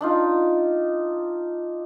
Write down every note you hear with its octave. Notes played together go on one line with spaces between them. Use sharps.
D4 D#4 F4